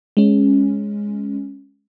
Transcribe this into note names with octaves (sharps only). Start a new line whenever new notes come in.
G#3 C#4